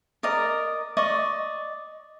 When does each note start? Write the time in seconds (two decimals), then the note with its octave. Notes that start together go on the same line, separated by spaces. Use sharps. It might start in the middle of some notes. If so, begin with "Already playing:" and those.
0.23 A#4 D5 D#5 A#5
0.97 D5 D#5 C#6